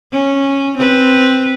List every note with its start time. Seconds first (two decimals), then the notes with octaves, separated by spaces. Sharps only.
0.12 C#4
0.77 C4 B4